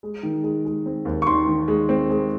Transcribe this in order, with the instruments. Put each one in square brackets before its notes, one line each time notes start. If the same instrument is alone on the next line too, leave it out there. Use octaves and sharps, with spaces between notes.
[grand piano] G#3
D#3
G#3
G#3
C4
D#2
C#6
D#3 C6
D#3
G#3
C4
G#3